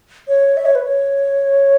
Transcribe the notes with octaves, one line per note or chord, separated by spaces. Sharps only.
C#5
E5
C#5
B4
C#5